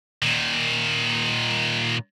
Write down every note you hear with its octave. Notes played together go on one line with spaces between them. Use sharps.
A#2 D#3